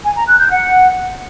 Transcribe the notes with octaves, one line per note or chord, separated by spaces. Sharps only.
G#5
A#5
F#6
G6
F#5